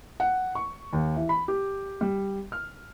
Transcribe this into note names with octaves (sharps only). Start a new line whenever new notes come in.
F#5
C#6
D#2
E3
B5
G4
G3
F6